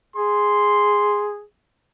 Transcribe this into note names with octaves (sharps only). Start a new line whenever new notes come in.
G#4 C6